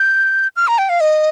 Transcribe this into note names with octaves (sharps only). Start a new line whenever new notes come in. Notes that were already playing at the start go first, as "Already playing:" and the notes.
Already playing: G6
F6
A#5
G5
F5
D#5